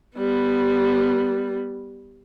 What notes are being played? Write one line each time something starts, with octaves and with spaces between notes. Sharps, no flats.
G3 B3